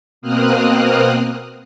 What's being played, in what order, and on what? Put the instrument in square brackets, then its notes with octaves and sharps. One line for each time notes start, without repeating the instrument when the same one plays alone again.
[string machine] B2 A#3 C4 D#6 F6 F#6